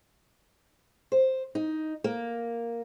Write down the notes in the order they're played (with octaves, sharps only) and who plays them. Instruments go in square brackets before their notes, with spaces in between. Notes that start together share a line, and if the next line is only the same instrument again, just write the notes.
[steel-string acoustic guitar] C5
D#4
A#3